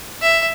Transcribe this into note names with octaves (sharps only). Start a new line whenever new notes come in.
E5